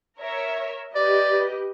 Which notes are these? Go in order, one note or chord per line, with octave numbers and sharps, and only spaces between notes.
A#4 C#5 E5
G4 B4 D5 D#5